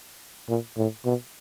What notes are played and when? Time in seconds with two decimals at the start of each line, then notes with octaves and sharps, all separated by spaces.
0.49 A#2
0.78 A2
1.05 B2